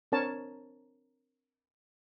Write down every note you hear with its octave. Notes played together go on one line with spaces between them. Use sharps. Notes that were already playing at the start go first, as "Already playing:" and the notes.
C4 D4 A#4 C#5 A5